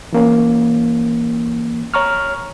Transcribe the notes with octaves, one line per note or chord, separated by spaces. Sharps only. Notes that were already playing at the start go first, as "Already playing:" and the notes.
E3 A#3 C#4
C#5 A#5 C#6 F6